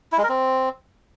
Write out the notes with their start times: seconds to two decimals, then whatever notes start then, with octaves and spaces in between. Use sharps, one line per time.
0.12 E4
0.18 G#3
0.23 A#4
0.29 C4